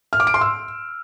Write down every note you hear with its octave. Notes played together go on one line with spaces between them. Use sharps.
F6
D6
D7
C6
E6